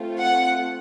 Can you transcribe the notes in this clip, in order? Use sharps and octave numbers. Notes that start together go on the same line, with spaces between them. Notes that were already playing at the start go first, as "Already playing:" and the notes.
Already playing: A3 C4 F4
F#5